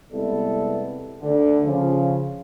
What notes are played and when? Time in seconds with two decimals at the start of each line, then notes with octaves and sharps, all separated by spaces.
0.12 C3 G3 G#3 B3 E4 A4
1.22 D2 D3
1.64 C#3 F3